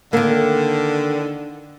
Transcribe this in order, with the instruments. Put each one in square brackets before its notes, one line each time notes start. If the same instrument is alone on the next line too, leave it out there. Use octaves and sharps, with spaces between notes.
[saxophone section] D3 [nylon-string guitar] D#3 A#3